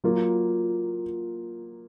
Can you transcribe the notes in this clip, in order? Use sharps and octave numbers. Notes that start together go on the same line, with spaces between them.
F#3 A#3 F4